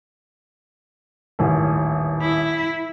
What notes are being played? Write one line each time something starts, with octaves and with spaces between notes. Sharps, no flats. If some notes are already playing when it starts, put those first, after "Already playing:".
D#1 A1
E4